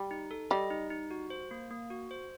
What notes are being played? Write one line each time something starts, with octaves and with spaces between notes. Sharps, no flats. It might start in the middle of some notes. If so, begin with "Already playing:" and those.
Already playing: G3
D#4
A4
G3 D#5
D#4
D#4
F#4
C5
A#3
A#3
F#4
C5